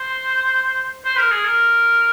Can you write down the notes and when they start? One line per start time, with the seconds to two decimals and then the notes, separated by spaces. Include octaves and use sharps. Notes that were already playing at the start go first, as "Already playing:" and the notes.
Already playing: C5
1.05 C5
1.18 A#4
1.31 G#4
1.45 A#4